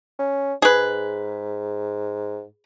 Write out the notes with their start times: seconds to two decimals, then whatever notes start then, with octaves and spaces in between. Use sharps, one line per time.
0.19 C#4
0.62 G#2 G#4 B4